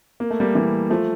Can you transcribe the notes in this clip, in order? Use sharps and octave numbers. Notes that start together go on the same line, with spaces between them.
A#3
A3
G3 A#3
E3 G3
F3 A3